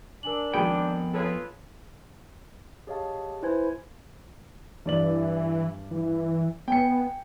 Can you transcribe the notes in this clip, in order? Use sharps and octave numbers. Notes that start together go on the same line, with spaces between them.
D4 A#4 G#5 F#7
G#1 F2 B3 G#4 G5 B5
F4 G#4 A4 B4 C#5
G4 G#4 C#5 D#5 F5 A5
E4 B4 C5 G#5 G#6
G2 E3 D5 F#7
E3
B3 G5 G#5 C#7